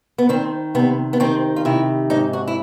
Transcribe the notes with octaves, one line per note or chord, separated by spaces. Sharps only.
B3
D#3 C4
C3 B3
B3
D#3 C4
F4
C3 E4
G#2 D#4
F#4
E4